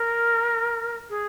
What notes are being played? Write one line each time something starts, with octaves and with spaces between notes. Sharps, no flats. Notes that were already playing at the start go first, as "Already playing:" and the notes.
Already playing: A#4
G#4